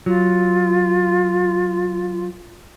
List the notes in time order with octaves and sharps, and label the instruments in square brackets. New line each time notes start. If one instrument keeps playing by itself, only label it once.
[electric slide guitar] F#3 [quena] F4